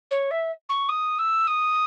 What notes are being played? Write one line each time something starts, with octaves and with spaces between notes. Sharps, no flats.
C#5
E5
C#6
D#6
E6
D#6